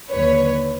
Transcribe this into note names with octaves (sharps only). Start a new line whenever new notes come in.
D#2 D3 F#3 B4 C#5